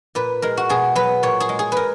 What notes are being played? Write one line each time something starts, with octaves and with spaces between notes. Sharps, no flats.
A#2 B4
G#3 A#4
F#4
B2 G#4
F#3 B4
A#2 C#5
G#4
G#3
G#4
A#4 B4